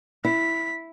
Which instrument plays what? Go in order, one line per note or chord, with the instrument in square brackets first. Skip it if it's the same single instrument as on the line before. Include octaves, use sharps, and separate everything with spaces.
[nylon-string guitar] E4 [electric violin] B6